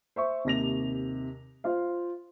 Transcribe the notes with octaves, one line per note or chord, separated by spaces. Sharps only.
C5 E5 C#6
D#2 C3 A#6 F7
F4 C5 F5